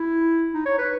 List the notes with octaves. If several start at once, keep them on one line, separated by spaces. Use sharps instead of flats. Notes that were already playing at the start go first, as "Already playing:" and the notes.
Already playing: E4
D#4
C#5
B4